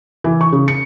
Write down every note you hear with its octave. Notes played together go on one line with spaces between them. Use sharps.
E3
C#6
C#3
C#7